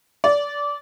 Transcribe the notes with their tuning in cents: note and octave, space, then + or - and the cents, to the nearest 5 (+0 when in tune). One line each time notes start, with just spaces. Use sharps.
D5 -20